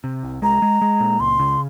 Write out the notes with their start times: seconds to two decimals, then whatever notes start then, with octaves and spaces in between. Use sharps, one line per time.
0.04 C3
0.23 C2
0.42 G#3 A#5
0.62 G#3
0.82 G#3
1.00 A#2
1.20 C#2 C6
1.39 C#3